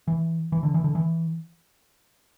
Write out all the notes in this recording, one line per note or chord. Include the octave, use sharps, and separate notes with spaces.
E3
E3
D3
E3
D3
E3